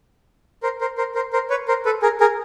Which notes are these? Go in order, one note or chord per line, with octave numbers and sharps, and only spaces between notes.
A#4 C5
A#4 C5
A#4 C5
A#4 C5
A#4 C5
B4 C#5
A#4 C5
A4 B4
G#4 A#4
G#4 A#4